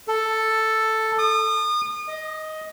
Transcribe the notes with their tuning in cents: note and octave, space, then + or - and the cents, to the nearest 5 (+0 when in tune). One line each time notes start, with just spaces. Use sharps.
A4 +5
D#6 -35
D#5 +10